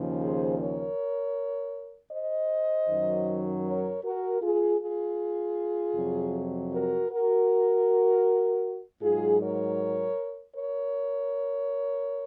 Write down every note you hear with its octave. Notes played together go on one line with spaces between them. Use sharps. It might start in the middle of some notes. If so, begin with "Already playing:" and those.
Already playing: D#2 C#3 F3
G#4 C5
A#4 C#5
C5 D#5
F#2 D#3 F#3
A#4 C#5
F#4 A#4
F4 G#4
F4 G#4
F2 C3 F#3
F#4 A#4
F#4 A#4
G#2 F#3 F4 G#4
A#4 C#5
A#4 C#5